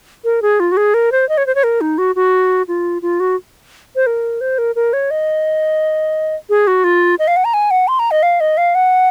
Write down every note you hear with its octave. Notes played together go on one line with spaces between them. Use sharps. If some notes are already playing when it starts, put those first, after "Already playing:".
A#4
G#4
F4
F#4
G#4
A#4
C5
D#5
C#5
C5
C#5
A#4
D#4
F#4
F#4
F4
F4
F#4
C5
A#4
C5
A#4
A#4
C#5
D#5
G#4
F#4
F4
D#5
F5
F#5
A#5
G#5
F#5
C6
A#5
D#5
F5
D#5
F5
F#5